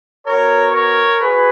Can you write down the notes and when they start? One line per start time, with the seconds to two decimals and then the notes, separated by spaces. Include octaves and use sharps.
0.26 B3 F#4 A#4 C#5
0.74 A#4 C#5
1.20 F#4 G#4 B4